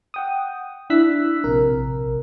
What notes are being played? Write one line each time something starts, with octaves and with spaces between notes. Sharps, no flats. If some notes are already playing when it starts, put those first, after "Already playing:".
F#5 G5 D#6
D4 E4 E6 F#6 B6
A#1 C3 A#4